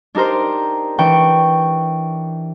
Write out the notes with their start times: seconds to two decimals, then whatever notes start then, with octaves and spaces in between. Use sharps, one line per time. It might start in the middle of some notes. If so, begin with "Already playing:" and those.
0.15 D4 D#4 G4 A#4 C5
0.99 E3 D4 G5 C#6